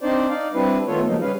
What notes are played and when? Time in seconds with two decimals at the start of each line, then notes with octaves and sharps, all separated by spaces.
0.01 C4 D4 D#4 C5 D5
0.30 D#4 D5 F5
0.54 G3 C4 D4 E4 B4
0.87 D#3 A3 B3 F4 A4 C#5
1.06 C#3 F3 F#3 G#3 A#3 D#4
1.21 G3 C#4 G#4 B4 F5